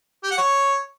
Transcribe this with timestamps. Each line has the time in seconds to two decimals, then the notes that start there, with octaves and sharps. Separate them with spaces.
0.24 G4
0.31 F#5
0.38 C#5